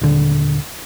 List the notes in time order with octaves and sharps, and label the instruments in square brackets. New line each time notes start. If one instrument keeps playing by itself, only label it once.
[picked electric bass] D#1 D3